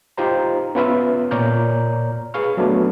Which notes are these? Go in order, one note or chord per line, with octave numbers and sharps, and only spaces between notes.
D#4 F4 G4 C5 A#5
B3 C#4 F4 B4 E5 F5
A#2 C#5 D5 A#5 F6 G6
G#4 B4 F5 C#6 F6
F#3 A3 B3 D4